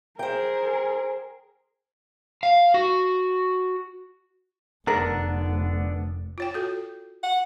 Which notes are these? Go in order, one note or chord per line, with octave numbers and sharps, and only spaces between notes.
G#4 A#4 C5 G5
F5
F#4
F1 D3 B3 D4 A#4
F4 C#5 G5
F#4 A4
F#5